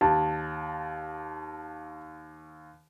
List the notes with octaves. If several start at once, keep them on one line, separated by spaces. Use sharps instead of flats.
D#2 A5